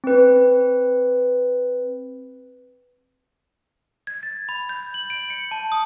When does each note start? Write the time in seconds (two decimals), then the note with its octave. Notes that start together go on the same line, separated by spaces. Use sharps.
0.04 C4 B4
4.07 G#6
4.23 A6
4.49 B5
4.69 G6
4.94 F#7
5.10 D7
5.30 C#7
5.51 A5
5.72 D#6